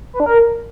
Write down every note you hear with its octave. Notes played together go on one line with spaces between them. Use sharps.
B4
D4
A#4